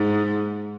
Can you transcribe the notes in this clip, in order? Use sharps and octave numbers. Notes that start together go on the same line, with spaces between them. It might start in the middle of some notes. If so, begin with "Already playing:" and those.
Already playing: G#2